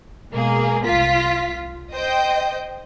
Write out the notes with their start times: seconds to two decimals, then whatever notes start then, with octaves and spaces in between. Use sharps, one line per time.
0.32 B2 G#3 A#3 G#4
0.84 C2 F4 B6
1.94 C5 D#5 G5 G6